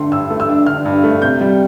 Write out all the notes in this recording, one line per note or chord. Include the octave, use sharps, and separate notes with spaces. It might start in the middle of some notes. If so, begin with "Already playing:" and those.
Already playing: D3 A3 D4 C6
G2 E6
A3
E6
D4
D3 F6
G2
A3
C3 G6
G3